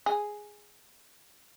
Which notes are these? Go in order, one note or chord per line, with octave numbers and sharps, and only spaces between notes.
G#4